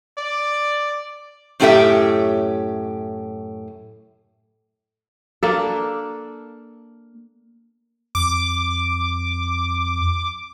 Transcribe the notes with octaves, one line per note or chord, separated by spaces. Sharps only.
D5
F#2 A2 C#4 G4 A4 E5
A#3 D4 A4
F2 D6